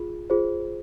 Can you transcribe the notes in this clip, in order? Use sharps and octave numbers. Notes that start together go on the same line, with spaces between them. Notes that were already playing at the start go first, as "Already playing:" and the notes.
Already playing: F4 G#4
F4 G#4 C5